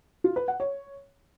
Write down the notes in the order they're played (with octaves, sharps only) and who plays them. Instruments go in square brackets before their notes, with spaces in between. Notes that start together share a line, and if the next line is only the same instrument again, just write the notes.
[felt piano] F4
B4
F#5
C#5